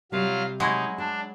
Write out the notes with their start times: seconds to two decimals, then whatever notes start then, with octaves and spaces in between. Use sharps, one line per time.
0.12 C3 F#3 G3 F4 F5
0.60 F#3 G#3 D#4 E4
0.98 D4 A5